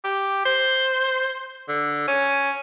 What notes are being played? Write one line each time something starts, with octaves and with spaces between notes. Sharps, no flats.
G4
C5
D3
C#4